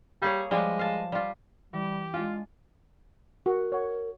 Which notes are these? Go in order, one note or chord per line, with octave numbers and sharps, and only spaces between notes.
G3 A#3 G#4 C#5
F3 G3 G#3
F5 A5
G3 F4
E3 G3 G4
G#3 D4 F4 F5 G#5
F#4 A#4
C#5 F#5